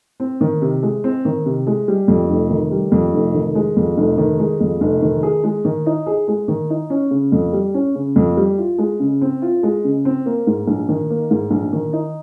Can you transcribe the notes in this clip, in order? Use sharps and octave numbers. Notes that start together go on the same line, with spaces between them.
C4
D#3
C3
G#3
C4
D#3
C3
G#3
G3
F2
F1
D#3
G3
F2
F1
D#3
G#3
F2
F1
D#3
G#3
F2
F1
D#3
G#4
G#3
D#3
D#4
G#4
G#3
D#3
D#4
C#4
C#3
F2
G3
C#4
C#3
F2
G3
F4
G#3
C#3
C4
F4
G#3
C#3
C4
A#3
G#2
A#1
D#3
A#3
G#2
A#1
D#3
D#4